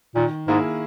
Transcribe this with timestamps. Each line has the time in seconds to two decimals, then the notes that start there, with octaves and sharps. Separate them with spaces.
0.15 A#2 D#3
0.48 G#2 A#3 E4 G#4